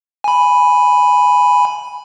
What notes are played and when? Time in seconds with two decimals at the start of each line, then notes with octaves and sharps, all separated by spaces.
0.24 G#5 B5